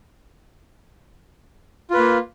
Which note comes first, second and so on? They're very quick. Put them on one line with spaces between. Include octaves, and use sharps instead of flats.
F4 B4 A#3